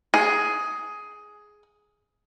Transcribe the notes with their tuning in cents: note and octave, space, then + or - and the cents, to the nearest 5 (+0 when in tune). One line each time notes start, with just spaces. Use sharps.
G#4 +10